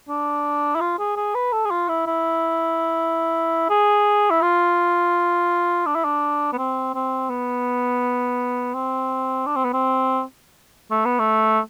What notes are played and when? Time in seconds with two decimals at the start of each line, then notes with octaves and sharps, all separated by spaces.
0.09 D4
0.75 E4
0.81 F4
0.99 G#4
1.16 G#4
1.35 B4
1.52 A4
1.65 G#4
1.71 F4
1.89 E4
2.07 E4
3.70 G#4
4.30 E4
4.42 F4
5.86 D4
5.95 E4
6.04 D4
6.53 B3
6.58 C4
6.94 C4
7.30 B3
8.74 C4
9.47 D4
9.55 C4
9.64 B3
9.73 C4
10.91 A3
11.05 B3
11.19 A3